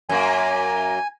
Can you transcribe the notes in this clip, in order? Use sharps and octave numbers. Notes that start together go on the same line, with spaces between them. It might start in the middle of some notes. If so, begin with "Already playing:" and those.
F#2 A#3 G#5